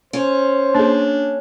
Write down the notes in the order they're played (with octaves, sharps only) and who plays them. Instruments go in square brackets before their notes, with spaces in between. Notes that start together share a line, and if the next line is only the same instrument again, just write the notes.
[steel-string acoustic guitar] C#4 [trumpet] C5
[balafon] A#3 G#4 [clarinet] D4